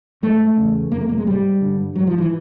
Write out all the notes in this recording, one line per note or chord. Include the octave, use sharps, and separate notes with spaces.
G#2 A3
E2 C#3
F2 C3 A#3
A3
A#3
G#3
G#2 G3
G2 D3
G#2 F#3
F3
E3